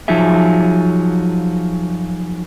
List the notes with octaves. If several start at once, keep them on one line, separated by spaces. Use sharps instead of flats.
F3 F#3 D#4 F4 G#4 E5